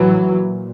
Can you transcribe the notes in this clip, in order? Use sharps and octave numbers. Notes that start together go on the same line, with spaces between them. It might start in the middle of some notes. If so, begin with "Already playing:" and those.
Already playing: A2 E3 F#3
A#2